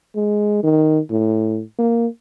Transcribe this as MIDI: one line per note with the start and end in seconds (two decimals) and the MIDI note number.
0.16 0.62 56
0.63 0.99 51
1.10 1.61 45
1.78 2.07 58